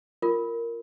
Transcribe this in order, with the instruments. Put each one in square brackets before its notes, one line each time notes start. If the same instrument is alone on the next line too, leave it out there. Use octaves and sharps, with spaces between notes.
[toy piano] F4 A#4